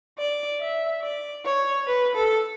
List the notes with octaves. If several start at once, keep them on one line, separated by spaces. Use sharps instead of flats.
D5
E5
D5
C#5
B4
A4